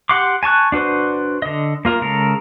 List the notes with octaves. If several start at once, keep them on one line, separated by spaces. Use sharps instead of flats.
G4 F#5 C6 D6
G#5 A5 C#6 F#6
D4 F#4 B4 C5
D3 D#5
A#3 F4 A#4
C#3 G#3 A4 A#4